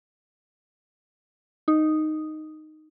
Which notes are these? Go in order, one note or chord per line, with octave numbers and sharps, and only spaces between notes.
D#4